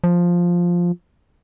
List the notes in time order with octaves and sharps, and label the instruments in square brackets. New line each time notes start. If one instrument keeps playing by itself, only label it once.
[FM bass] F3